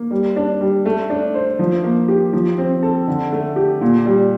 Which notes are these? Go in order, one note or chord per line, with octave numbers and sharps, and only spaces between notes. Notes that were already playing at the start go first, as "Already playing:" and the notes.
Already playing: A#3
G3
D4
G3
A3
D4
C5
F3
A#3
G4
F3
C4
A4
D3
A3
G4
A#2
G3